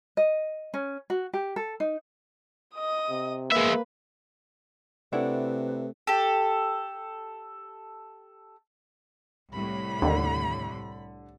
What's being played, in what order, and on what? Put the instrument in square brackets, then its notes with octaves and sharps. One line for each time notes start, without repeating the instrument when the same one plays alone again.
[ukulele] D#5
C#4
F#4
G4
A4
D#4
[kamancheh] D#5 D#6
[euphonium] C3
[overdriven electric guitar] G#3 E5 [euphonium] A#3 [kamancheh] B4
[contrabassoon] C3 [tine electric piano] A3 [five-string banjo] D4 E4 F#5 [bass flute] B4
[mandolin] G4 A4
[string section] C2 A2 [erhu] B5
[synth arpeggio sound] D#2 [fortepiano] D3